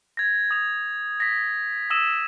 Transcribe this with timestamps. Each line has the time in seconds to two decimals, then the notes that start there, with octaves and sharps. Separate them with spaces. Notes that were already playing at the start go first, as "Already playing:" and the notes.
0.17 G#6 A#6
0.51 D#6 F7
1.20 A#6 B6
1.90 D#6 E6 A#6 D#7 E7